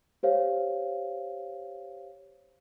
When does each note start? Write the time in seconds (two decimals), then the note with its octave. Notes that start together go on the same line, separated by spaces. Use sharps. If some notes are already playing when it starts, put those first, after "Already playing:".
0.23 G4 C5 C#5 F5